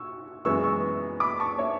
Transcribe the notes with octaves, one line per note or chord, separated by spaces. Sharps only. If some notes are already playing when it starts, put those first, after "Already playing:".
Already playing: C#6 E6
F#2 E3 G#3 B3 C#6 E6
C#6 E6
B5 D6
A5 C#6
C#5 E5